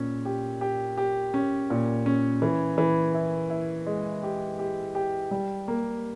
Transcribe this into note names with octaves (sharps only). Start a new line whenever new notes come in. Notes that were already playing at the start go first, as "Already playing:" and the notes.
Already playing: A#2 C#4
G4
G4
G4
C#4
A#2
C#4
E3
E3
E4
E4
G#3
G4
G4
G4
G3
A#3